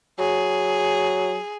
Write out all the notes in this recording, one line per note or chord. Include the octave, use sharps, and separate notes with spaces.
F#3 G#4